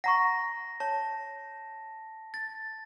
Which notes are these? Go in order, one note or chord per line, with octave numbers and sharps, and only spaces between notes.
F#5 A#5 C#6 A#6
C#5 A5
A6